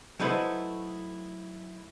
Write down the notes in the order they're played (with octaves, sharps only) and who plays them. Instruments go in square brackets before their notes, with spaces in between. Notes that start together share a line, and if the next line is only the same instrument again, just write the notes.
[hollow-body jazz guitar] F#3 A3 D#4 E4 B4 C5